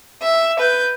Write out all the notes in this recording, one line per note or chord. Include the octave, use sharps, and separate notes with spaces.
E5
B4 G6